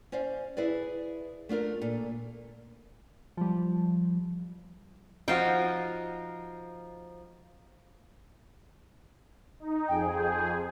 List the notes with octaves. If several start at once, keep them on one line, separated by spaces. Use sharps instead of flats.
C#4 C5 D5 F5
E4 G#4 B4 D5
A3 D4 F4 A#4
A#2 A4
F3 G3
F3 D#4 F#4 F5 G5
D#4
F2 G#4 G5
G6